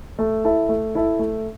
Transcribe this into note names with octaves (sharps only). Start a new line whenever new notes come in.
A3
E4 A4 E5
A3
E4 A4 E5
A3